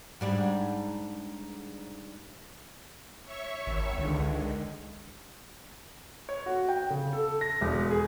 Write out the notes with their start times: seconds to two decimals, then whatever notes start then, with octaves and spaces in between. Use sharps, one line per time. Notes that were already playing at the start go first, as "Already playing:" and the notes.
0.21 G#2 G3 D4
3.24 C#5 E5 C#6
3.67 G#1
3.98 C#2 D3 D#3 G#3
6.29 C#5
6.46 F#4
6.68 G5
6.90 C#3
7.13 A4
7.41 A#6
7.61 E1
7.91 G#4